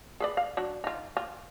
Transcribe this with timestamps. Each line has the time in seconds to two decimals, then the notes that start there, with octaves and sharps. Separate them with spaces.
0.20 G#4 B4 D5
0.37 F5
0.57 F#3 D4
0.84 D#4 F4
1.17 F4